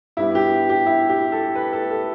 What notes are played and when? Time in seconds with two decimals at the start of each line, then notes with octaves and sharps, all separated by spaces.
0.17 G2 G3 B3 E4
0.35 G4
0.69 G4
0.86 E4
1.09 G4
1.32 A4
1.55 B4
1.73 A4
1.90 A4